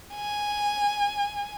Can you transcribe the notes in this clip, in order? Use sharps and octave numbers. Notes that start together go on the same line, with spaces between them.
G#5